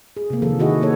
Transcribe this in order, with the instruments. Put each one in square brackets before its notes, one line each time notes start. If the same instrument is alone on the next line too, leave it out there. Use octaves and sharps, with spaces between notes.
[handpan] G#4
C3 A#3
D#3 F3 A4
D#3 E4 F#4 G#4 D#5
A#3 A4 C#5